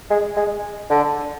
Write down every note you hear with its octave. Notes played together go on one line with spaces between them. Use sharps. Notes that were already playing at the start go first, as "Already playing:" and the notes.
G#3
G#3
D3